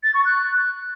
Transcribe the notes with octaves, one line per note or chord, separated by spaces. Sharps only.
A6
C#6
F#6